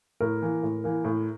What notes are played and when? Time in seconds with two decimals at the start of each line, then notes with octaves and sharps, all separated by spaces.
0.21 A2 A#4
0.42 E3 A#3
0.63 A2
0.84 E3 A#3
1.05 A2